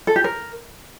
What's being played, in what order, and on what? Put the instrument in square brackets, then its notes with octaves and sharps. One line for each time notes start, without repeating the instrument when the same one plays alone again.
[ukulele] A4
G4
A#4